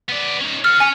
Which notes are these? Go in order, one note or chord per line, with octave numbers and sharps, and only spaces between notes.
B3 D5
C#4 D#4
A4 F#5 F6
C#4 G#5 C#7